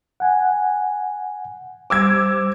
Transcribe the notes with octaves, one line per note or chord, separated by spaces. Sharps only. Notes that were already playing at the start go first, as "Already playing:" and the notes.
F#5 G#5
G3 C5 D6 E6 G#6